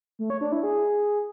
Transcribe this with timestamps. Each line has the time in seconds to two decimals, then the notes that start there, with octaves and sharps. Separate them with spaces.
0.19 A3
0.30 C#5
0.41 D4
0.52 E4
0.63 G#4